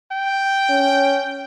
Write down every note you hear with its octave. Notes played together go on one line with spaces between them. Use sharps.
G5
C#4